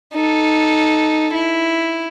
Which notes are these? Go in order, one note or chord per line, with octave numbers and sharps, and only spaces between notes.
D#4 A4
E4